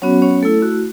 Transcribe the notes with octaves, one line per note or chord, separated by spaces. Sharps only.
F#3 B3 C#4 F#4 C#5
C#4 C#5
A3 E4 A4
F#4